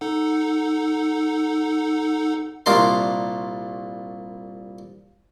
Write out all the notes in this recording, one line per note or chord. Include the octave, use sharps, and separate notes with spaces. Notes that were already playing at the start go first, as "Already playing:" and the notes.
D#4 A4 F#5
C2 A#2 D4 A#4 A5 C6